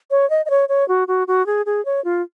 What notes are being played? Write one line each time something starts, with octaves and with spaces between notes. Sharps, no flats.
C#5
D#5
D#5
C#5
C#5
F#4
F#4
F#4
G#4
G#4
C#5
F4